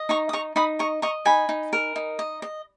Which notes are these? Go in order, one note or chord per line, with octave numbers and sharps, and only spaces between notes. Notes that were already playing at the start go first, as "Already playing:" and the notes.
Already playing: D#5
D#4 A#5 C#6
D#6
D#4 A#5 C#6
D#4 B5 D#6
D#5 A#5 C#6
D#5 A#5 C#6
D#4 G#5 B5
D#4
A#4
D#4
D#5
D#5